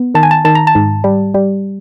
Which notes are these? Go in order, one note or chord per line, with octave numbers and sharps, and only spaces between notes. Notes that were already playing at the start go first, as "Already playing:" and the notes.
Already playing: B3
D#3 A5
G#5
A5
D#3 A5
A#5
A5
G#2
G3
G3